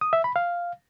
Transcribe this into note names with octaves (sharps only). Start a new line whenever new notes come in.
D#6
E5
B5
F5